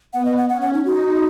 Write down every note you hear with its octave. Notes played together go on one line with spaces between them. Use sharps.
B3 F#5
D#5
F#5
C#4 F#5
F#5
D#4
D#4 F#4